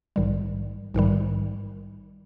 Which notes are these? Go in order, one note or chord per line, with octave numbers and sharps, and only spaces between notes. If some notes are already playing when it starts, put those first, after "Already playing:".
A#1 G#2 D#3 G3
A#1 G#2 D#3 G3